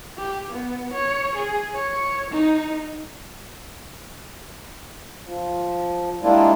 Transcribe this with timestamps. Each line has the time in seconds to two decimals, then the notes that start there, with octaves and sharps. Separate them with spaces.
0.17 G4
0.50 B3
0.93 C#5
1.35 G#4
1.75 C#5
2.30 D#4
5.24 F3
6.22 G3 G#3 A#3 D4 E4 F4